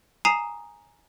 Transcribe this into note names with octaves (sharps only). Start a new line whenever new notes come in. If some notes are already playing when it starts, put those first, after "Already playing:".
G#5 A#5 D#6 C7 E7